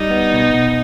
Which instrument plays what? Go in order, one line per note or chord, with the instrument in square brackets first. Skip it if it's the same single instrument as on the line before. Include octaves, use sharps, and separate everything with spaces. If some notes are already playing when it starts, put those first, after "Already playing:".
Already playing: [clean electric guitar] G3 [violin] D#4
[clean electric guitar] B3
B2
B2